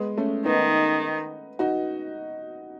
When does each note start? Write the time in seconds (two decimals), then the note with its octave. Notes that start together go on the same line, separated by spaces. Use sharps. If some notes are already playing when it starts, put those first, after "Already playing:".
Already playing: G#3 B3
0.17 A3 C#4
0.46 D#3 B3 D#4
1.59 D#4 F#4